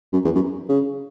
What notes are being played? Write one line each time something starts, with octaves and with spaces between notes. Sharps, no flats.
F#2
E2
F#2
C#3